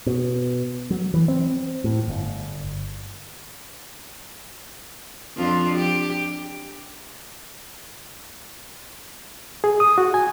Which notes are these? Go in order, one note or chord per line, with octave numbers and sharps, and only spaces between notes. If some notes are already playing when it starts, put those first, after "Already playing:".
B2
F#3
E3
C4
A2
G1
F2 D4 F4
G4
G#4
D#6
F#4
G#5